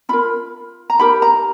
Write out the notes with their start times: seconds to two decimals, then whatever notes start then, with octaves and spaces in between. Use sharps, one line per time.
0.09 C#4 F4 A#4 B5
0.90 A#5
0.99 D#4 G4 A#4 B5
1.22 A#5